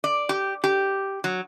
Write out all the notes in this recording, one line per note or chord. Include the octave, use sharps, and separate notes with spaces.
D5
G4
G4
F#3